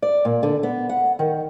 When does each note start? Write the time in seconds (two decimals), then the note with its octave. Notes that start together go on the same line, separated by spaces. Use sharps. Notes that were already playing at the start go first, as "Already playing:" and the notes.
0.02 D5
0.25 A#2
0.43 D3
0.63 B3
0.89 F#5
1.19 D#3